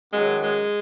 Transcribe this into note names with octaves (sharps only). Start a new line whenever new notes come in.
F#2 D#3 F#3 G#3
G#3